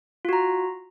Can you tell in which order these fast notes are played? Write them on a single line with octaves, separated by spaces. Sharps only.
F4 F#4 A#5